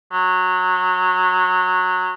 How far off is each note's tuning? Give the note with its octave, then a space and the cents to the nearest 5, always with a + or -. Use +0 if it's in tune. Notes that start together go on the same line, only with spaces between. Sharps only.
F#3 -15